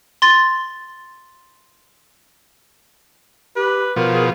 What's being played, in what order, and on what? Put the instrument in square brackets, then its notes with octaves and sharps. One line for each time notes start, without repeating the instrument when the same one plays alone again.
[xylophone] C6 A6
[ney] G4 [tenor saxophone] B4
[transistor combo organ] B2 F3 [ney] A#4
[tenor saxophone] G#4